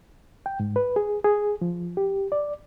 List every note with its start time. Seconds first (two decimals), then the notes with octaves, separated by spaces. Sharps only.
0.46 G5
0.60 G#2
0.76 B4
0.96 G#4
1.24 G#4
1.61 F3
1.97 G4
2.32 D5